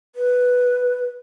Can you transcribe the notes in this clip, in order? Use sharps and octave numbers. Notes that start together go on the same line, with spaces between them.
B4